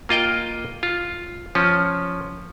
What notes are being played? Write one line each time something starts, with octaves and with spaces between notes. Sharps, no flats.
A#3 F4 D#5 G5
F4
F3 C#4